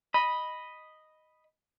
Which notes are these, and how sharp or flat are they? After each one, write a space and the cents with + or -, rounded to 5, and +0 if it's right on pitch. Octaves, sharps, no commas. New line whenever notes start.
D#5 +0 B5 -5